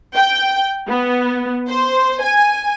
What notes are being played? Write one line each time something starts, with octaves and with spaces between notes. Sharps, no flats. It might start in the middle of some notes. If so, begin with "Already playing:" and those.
G5
B3
C5
G#5